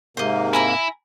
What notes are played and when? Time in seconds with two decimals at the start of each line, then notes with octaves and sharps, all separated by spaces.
0.17 G#2 C3 A#3 C5 D#5
0.53 E4 G#5 A#5 B5